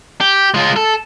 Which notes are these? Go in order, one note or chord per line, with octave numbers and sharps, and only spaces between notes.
G4
G#3 F4
A4